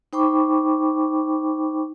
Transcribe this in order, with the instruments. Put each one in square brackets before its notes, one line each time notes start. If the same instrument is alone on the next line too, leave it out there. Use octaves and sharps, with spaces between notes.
[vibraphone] D#4 C5 G5 B5 C#6 D6